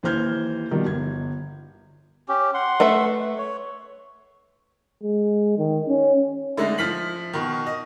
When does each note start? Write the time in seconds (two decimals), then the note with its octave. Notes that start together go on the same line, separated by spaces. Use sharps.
0.03 D#2 E3 C5 F6 G6 G#6
0.71 B2 D#3 F3 G3
0.86 G1 G#6
2.28 C#4 G4
2.54 F#5 C6
2.80 A3 B4 E5
3.38 C#5
5.03 G#3
5.58 D#3
5.88 C#4
6.57 D3 G#3 A3 D#4
6.78 F3 F6 B6 F#7
7.33 B2 D#3
7.66 D#5